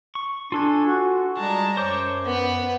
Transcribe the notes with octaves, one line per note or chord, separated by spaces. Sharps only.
C#6
D4 F4 A4 G#5
F#4
G3 G#3 A5 A#5
F#2 C5 C#5 D6 G6
B3 B4